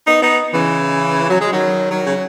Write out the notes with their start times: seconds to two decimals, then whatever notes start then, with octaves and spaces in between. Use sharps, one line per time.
0.07 B3 D#4
0.22 B3 D#4
0.53 C#3 E3
1.30 F#3
1.41 G#3
1.52 D#3 F#3
1.91 D#3 F#3
2.06 C#3